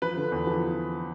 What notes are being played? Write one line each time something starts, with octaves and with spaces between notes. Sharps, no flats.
F3 B4
D3
E2
F3